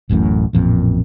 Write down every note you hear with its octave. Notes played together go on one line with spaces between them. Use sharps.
D1 A1 F#2 A2
A1 F2 A#2